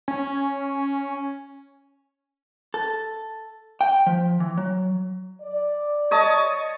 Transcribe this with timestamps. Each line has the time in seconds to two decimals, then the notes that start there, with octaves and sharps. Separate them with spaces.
0.08 C#4
2.74 A4
3.81 G5
4.07 F3
4.40 E3
4.57 F#3
5.42 D5
6.11 C#5 D#5 A5